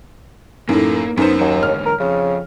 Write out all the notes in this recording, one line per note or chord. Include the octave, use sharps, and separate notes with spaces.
F#2 A2 A#3 D#4 E4
F#2 B3 D#4 A#4 C5
D#2 F#3 F#4
G#2 D3 C#5 F6
A#4
F2 C#3